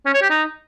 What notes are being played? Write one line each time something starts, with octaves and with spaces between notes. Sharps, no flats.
C#4
C#5
G4
D#4